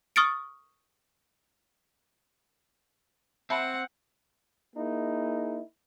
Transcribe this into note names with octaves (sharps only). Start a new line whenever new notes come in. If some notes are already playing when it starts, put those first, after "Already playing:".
C#6 D#6 F6 A6 C#7 D7
C4 E5 F#5 A5 B5
A#3 D#4 E4 G#4